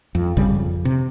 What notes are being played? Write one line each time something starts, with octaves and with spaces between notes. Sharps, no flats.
F2
G#1 F2 C#3 G3
F2
C3